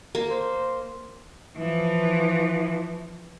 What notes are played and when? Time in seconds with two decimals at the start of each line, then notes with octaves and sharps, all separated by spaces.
0.15 A#3
0.30 C5
1.57 E3 F3